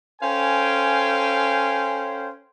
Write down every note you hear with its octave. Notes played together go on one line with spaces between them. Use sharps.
C#4 A4 C5 F5 G5 G#5